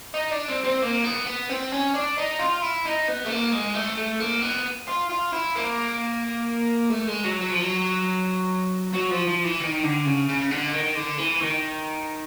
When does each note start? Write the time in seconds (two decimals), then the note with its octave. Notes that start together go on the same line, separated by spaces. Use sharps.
0.14 D#4
0.31 D4
0.49 C4
0.65 C4
0.82 A#3
1.05 B3
1.27 B3
1.49 C4
1.72 C#4
1.94 D4
2.18 D#4
2.39 F4
2.62 E4
2.85 D#4
3.08 B3
3.25 A3
3.30 A#3
3.52 G#3
3.74 A3
3.97 A3
4.20 A#3
4.42 B3
4.88 F4
5.10 F4
5.33 E4
5.56 A#3
6.90 A3
7.07 G#3
7.24 F#3
7.41 F#3
7.51 F3
7.61 F#3
8.93 F#3
9.10 F3
9.27 F3
9.44 E3
9.60 D#3
9.83 D3
10.05 C#3
10.29 C#3
10.51 D3
10.74 D#3
10.96 D3
11.18 E3
11.41 D#3